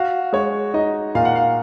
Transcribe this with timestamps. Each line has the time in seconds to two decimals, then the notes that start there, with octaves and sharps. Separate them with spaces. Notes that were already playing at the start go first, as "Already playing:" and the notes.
Already playing: F#4 F5
0.32 G#3 C#5
0.74 D#4 D#5
1.15 A#2 F5
1.25 F#5
1.35 F5